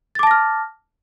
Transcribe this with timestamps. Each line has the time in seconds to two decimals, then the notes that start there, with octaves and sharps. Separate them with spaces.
0.15 A6
0.19 D6
0.23 A5
0.27 A#6
0.31 F6